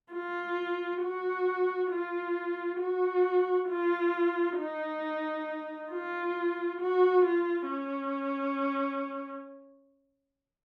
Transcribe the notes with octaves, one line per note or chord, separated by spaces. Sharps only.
F4
F#4
F4
F#4
F4
D#4
F4
F#4
F4
C#4